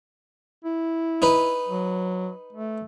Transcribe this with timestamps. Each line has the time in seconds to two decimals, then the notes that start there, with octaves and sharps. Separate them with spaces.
0.65 E4
1.22 D#4 B4
1.69 F#3
2.53 A3